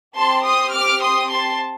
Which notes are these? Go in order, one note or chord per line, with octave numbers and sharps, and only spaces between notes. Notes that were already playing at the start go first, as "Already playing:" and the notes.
C4 G4 A5 C6
C6 D#6
D6 F6
C6 D#6
A5 C6